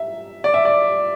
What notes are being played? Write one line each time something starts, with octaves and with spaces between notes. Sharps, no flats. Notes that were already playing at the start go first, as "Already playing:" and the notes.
Already playing: E5
D5
E5
D5